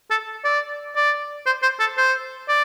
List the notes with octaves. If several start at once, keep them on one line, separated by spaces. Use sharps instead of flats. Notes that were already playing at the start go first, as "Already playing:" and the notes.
A4
D5
D5
C5
C5
A4
C5
D5